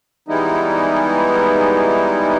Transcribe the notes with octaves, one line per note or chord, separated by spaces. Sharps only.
E3 G3 G#3 B3 D#4 E4